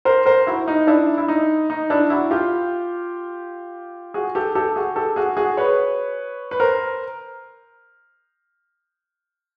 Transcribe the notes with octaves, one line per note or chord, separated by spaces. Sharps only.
A#4 C5
A#4 C5
E4 F#4
D#4
D4 E4
E4
D#4
D#4
D4 E4
E4 F#4
F4 G4
F#4 G#4
G4 A4
G4 A4
F#4 G#4
G4 A4
F#4 G#4
F#4 G#4
B4 C#5
B4
A#4 C5